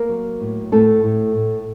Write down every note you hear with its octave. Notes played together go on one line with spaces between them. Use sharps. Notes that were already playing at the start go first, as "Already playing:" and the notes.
Already playing: A#3 A#4
F#3
A2
A2 A3 A4
A2
A2